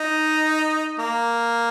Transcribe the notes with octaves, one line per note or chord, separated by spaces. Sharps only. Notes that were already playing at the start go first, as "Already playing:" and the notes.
Already playing: D#4
A#3